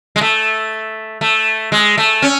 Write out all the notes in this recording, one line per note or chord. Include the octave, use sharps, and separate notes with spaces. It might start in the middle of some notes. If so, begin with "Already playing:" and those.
G#3
A3
A3
G#3
A3
C#4